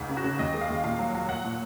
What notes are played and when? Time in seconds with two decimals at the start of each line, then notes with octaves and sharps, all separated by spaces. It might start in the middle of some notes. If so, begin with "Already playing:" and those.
Already playing: C#2 G#2
0.09 C#3
0.17 F#4
0.24 C#3
0.39 D#2 D#5
0.54 G#3
0.61 F5
0.70 D#2
0.84 A#2 F5
0.99 F#3
1.15 F#3
1.29 F#3 F#5
1.45 A#2